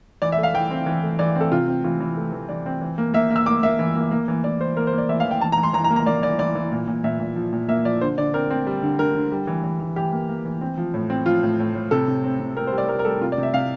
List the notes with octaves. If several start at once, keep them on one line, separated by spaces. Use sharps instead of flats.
E3 D5
E5
A3
F5
E3 G5
C4
E3
A3
E3 D5
C4
A4
C3 F4
C4
E3 F4
E3
A3
E3
E3 D5
C4
E3
A#3
A#3 E5
A#3
E6
A#3 D6
A#3 E5
E3
A#3
A#3
E3
E3 D5
E3 C5
A#3 A#4
C5
A#3
D5
E3 E5
F5
E3
G5
E3 A5
A#5
E3
C6
E3 A#5
A#5
A#3
A#5
A#3 D5
E3 D5
E3 D5
E3
A#2
A#2
A#2 E5
A#2
F3
A#2
A#3 E5
F3 D5
D3 C5
D3 D5
C4 A#4
C4
G3
D3
D3 A#4
D3
G3
E3
E3
E3
E3 G4
A#3
A#3
E3
C4
F3
A2
C4
F3 F4
A2
A2
A2
C3 A4
C3
C4
C3
C4 A#4
C5
G3
D5
G3 A#4
A#4
G3 A4
C3 F4
D5
C3
E5
C3 F5